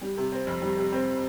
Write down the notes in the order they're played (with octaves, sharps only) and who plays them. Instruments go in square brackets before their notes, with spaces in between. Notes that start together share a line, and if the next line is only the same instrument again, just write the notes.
[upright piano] G3
C3
C4
F2
G3
C3
C4